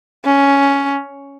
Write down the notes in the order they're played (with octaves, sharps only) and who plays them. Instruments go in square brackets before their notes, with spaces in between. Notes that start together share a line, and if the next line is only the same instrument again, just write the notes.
[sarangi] C#4